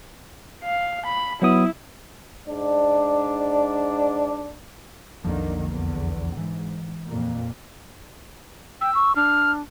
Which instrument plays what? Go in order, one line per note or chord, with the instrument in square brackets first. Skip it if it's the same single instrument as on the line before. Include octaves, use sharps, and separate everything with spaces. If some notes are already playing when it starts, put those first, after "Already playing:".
[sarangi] F5
B5
[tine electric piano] F#3 B3 D#6 [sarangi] E4
[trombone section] G#2 D4
[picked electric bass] B1 F2 F3 [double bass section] D3 D#3 A#3
[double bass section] E2 D3
[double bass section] G#2 [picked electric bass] E3
[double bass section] F2 A#2 A#3
[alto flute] G5 [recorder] E6
[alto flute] C#6
[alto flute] D4 [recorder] F6